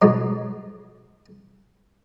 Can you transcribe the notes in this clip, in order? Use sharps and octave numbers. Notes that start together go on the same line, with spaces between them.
F2 G#2 B2 F#3